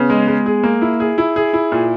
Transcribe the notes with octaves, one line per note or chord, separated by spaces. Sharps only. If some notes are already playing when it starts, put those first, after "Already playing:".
Already playing: C#3 B3
G#3
G#3
G#4
A#3
E4
G#4
E4
G#4
E4
A#2